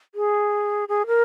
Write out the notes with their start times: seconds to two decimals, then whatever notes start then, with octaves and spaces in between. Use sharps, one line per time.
0.15 G#4
0.89 G#4
1.07 A#4